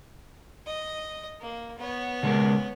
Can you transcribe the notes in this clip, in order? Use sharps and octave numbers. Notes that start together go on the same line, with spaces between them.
D#5
A#3
B3 C#5
C#3 G#3 A#4